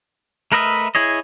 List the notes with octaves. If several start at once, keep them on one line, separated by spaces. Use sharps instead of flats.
A3 A#4 B4 D#5 E5
E4 G#4 C#5 D#5